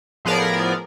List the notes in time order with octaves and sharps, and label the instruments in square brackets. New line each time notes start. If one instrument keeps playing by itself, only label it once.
[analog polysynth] A2 F3 B3 G#4 A#4 D5